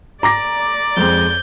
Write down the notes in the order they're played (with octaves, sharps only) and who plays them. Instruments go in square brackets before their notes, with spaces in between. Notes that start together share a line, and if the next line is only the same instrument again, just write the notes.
[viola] D5 [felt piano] A#5 D6 A#6
[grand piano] F2 G#3 C4 [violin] G6